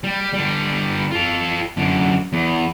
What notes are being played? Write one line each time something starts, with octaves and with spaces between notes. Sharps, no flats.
G3
D3 G3
F4 A4
F#2 D3
E2